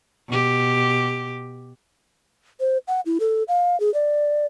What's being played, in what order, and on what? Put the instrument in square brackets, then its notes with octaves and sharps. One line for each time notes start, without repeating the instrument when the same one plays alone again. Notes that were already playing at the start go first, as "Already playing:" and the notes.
[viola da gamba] B2 G4
[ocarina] C5
F#5
E4
A4
F5
G#4
D5